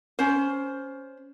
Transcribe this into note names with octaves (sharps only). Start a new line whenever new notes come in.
C#4 C5